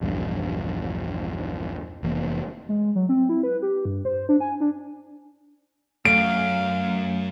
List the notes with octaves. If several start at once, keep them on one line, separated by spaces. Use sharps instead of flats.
A#1 E2 G2
F1 E3 A#3 B3
G#3
F#3
C4
E4
B4
G4
G2
C5
D4
G#5
D4
F#2 A3 F5 D7